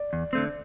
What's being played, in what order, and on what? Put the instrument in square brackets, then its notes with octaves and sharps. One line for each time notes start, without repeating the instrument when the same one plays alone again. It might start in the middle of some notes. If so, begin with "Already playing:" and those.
Already playing: [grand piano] D5
[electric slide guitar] E2
D3 A3 C4